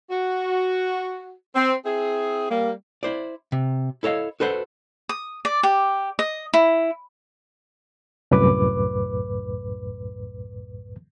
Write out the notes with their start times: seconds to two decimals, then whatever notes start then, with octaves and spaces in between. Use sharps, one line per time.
0.10 F#4
1.56 C4
1.86 C4 E4 G#4
2.51 G3 A#3
3.03 E4 C5 D5
3.52 C3
4.03 E4 A4 C#5 D#5 F5
4.40 F#4 A4 B4 C5 E5 F#5
5.09 D#6
5.45 D5
5.63 G4
6.19 D#5
6.54 E4
8.31 C2 F#2 A2 B4 D6